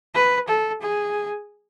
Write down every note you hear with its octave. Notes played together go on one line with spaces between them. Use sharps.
B4
A4
G#4